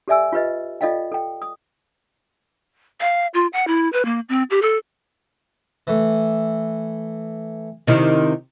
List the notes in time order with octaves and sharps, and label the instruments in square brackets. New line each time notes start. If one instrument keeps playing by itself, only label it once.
[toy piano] G4 A4 D5 E5 G#5 E6
F4 G4 B4 D#5
F4 A4 D5 D#5 F5 G5
A4 G5
D#6
[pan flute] F5
F4
F#5
E4
B4
A#3
C4
G4
A4
[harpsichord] E3 A3
[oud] C3 D#3 E4